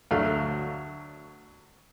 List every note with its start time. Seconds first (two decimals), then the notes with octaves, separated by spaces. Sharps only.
0.11 D2 F#3 A3 F5